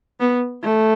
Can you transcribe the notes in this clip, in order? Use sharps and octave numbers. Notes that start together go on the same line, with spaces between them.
B3
A3